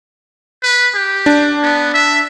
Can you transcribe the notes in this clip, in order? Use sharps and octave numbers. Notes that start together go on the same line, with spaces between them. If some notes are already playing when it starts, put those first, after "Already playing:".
B4
G4
D4
B3
E5